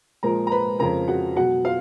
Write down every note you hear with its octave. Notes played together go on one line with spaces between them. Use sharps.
A#2 F3 G#3 A#4 A#5
A#5
B4 B5
F2 C#3 F3 A#4 A#5
F#4 F#5
B2 F#3 F#4 F#5
F4 F5